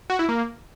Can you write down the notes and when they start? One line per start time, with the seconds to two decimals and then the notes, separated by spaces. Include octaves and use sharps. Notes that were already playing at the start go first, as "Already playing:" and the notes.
0.10 F#4
0.19 E4
0.29 A#3